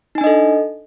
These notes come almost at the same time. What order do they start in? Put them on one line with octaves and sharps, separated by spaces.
D#4 G#5 D4 D#5 A4